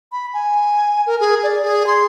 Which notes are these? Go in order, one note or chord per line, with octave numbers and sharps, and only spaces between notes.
B5
G#5
A#4
G#4
D5
G#4
C6